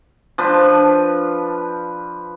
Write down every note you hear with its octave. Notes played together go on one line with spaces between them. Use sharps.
F3 D4 B4